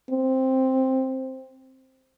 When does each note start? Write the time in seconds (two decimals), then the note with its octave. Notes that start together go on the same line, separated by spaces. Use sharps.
0.11 C4